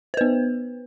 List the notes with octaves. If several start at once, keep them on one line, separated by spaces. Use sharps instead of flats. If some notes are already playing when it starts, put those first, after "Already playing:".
B3 B4 C5